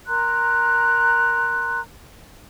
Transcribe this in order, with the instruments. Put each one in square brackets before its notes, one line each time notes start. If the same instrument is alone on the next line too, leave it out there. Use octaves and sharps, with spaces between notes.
[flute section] A#4 A#5 C6 F#6